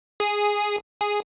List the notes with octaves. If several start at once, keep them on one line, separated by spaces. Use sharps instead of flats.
G#4
G#4